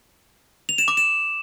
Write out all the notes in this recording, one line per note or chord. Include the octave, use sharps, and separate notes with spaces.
F7
E7
D6
E7